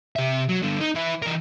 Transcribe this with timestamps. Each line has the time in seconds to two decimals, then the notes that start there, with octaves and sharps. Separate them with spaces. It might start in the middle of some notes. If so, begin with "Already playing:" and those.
0.16 C3 E5
0.49 F#3
0.62 G2 D3
0.80 D#4
0.95 E3 E4
1.22 E3 A#4